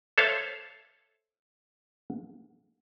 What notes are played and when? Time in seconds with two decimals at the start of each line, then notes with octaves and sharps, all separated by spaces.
0.18 A4 C5 C#5 E5 F5